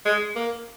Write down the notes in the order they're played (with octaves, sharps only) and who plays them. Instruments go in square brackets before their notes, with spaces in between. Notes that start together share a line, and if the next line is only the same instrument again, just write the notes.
[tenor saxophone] G#3
A#3